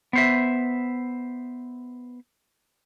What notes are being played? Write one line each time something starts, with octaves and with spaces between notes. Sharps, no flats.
B3 C5 E5